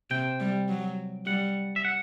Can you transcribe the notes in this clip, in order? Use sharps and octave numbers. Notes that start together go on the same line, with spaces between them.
C3 G5
G3
F#3
G3 F#5
E5
F#5